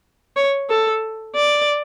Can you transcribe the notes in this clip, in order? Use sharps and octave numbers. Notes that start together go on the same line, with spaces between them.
C#5
A4
D5